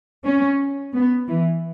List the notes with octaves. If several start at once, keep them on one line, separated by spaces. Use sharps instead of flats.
C#4
B3
E3